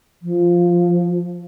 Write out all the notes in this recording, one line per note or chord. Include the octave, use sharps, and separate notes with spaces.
F3